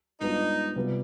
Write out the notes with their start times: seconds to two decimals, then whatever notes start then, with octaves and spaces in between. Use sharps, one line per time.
0.21 G#2 G3 B3 D4 D#4 F4
0.76 C3 G3 B3 F4